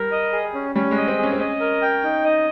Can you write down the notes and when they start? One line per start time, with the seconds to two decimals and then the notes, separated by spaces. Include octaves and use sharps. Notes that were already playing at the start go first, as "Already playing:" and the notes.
Already playing: G3 A#4
0.12 D#5
0.33 G#4
0.54 C#4
0.75 G3 C#4
0.91 G#3
0.97 D#5
1.08 C4
1.18 C#4 G#4
1.32 C4
1.39 C#4 D#5
1.60 A#4
1.82 G5
2.03 D#4
2.24 D#5